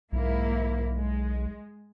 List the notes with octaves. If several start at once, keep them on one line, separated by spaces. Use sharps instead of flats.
B1 G#2 A#3 E4
G#3